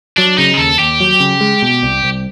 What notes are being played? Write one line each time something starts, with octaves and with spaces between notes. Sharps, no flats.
F#3 D4
C#3 D#4
G#4
D#2 A4
D#2 G4
F#3
C#3
G#3
B2
C2
C2